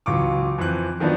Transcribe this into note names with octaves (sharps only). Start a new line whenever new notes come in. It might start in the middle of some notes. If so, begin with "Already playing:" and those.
C#2 E3 F#3 F4 C#6 D6
F2 E3 C4 F#6
D#3 F3 F#3 B3 D4